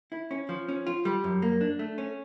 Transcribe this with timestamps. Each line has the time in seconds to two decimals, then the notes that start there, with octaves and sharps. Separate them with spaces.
0.12 E4
0.31 C#4
0.49 F3
0.69 C#4
0.87 F4
1.05 G3
1.24 F#2
1.42 A#3
1.61 D4
1.79 A3
1.98 C#4